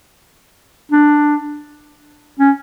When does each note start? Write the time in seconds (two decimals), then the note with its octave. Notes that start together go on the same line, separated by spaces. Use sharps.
0.92 D4
2.40 C#4